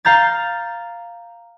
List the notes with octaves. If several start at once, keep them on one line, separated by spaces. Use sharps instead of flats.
F5 A#5 G6 A6